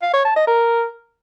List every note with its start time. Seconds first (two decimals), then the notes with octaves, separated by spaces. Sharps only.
0.02 F5
0.14 C#5
0.25 A5
0.36 D#5
0.47 A#4